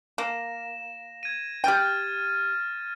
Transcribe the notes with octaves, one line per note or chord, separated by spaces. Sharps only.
A#3 A#6 E7
G#6 D#7
G4 G5 F6 A6 D#7